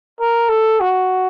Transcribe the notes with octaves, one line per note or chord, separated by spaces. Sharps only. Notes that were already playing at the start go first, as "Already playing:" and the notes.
A#4
A4
F#4